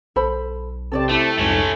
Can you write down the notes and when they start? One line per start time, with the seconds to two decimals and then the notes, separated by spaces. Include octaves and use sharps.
0.16 B1 A4 C5 B5
0.92 C3 C4 A4 C#5 D5 A5
1.09 A3 E4 G4
1.38 C2 F2 G#2 A3 C#4